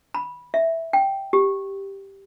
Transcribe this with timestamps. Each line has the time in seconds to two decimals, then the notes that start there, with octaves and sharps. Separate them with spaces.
0.15 B5
0.54 E5
0.93 G5
1.33 G4